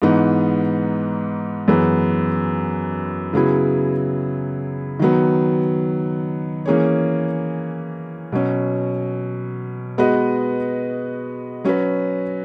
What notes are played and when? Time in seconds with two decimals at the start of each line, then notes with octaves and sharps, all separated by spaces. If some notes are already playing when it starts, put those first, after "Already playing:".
0.02 G#2 E3 B3 D#4
1.68 F#2 E3 G#3 B3
3.33 C#3 F#3 B3 E4 G#4
4.99 D#3 F#3 B3
6.65 E3 A#3 C#4 G#4 C#5
8.32 B2 F#3 C#4
9.98 G#3 B3 F#4 B4 D#5
11.65 F#3 C#4 F#4 B4